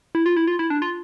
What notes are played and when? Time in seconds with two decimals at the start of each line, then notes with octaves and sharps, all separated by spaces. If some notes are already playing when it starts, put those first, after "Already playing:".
0.15 E4
0.26 F4
0.37 E4
0.47 F4
0.59 E4
0.70 D4
0.82 F4